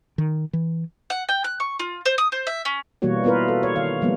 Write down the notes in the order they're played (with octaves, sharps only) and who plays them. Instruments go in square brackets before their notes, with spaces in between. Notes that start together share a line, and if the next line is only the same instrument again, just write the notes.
[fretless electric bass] D#3
E3
[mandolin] F#5
G5
F#6
C#6
F4
C5
D#6
C5
E5
C#4
[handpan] B2 E3 G3 A#3 F#4 C#5
B3 E4 F4 A#4 B4
A4
C#5
D#3 F5
F3 G3 G#3 A#3 B3